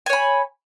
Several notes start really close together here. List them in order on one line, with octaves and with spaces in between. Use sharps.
G#5 C#5 B5